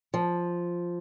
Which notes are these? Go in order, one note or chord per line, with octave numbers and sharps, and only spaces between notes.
F3